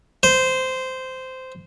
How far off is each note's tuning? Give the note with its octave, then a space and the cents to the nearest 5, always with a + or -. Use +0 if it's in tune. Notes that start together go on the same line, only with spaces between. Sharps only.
C5 -15